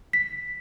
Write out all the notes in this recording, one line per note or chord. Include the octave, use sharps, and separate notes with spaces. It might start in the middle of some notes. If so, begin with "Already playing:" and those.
B6